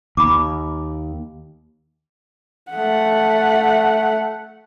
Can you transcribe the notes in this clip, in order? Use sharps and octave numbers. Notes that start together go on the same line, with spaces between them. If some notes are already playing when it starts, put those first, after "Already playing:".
D#2 B5 D6
A3 F#5